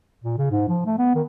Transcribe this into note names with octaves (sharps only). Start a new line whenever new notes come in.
A#2
C#3
G#2
F3
A3
B3
D#3